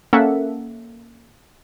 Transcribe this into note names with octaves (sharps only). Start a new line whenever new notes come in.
A#3 C#4 A4 E5 F#5